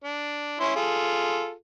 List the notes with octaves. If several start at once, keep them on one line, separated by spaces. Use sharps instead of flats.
D4
C#4 E4 C6
F4 G#4 A4